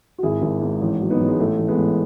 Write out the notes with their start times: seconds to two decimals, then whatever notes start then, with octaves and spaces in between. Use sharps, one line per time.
0.18 F#4
0.23 G#1 E4 G#4
0.42 G#1
0.61 G#2
0.82 A1
1.01 F#3
1.10 B3 D#4
1.20 A1
1.28 G#3
1.39 A1 A3
1.59 A1
1.68 G#3 B3
1.78 A1